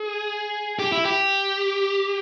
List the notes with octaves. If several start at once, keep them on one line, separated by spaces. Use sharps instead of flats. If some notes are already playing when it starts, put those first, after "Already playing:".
Already playing: G#4
G4
E4
G4